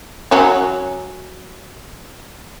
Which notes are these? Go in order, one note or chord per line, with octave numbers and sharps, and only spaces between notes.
F#3 C#4